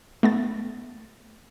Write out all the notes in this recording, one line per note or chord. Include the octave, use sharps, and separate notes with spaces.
A3 B3 A6